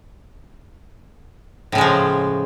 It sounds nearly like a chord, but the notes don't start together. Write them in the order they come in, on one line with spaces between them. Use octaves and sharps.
A2 C#3 G#3 F3